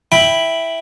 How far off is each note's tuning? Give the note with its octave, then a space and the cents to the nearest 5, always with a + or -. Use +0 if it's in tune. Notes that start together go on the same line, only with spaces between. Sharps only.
E4 +0 G5 +0 B5 +0